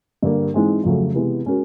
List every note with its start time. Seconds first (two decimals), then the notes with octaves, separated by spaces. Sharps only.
0.23 G2 D3 G3 A#3
0.54 G#2 E3 G#3 C4
0.84 F2 C#3 F#3 A3
1.14 C3 E3 G#3 B3
1.45 G#3 C#4 F#4 A#4